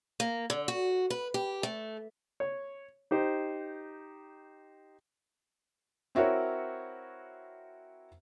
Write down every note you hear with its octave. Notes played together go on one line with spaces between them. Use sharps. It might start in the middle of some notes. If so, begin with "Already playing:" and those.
A#3
D3
F#4
B4
G4
A3
C#5
D#4 G4 C5
C4 E4 F#4 A#4 C#5